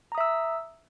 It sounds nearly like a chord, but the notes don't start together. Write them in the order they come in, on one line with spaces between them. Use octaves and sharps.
A#5 D#6 E5 E6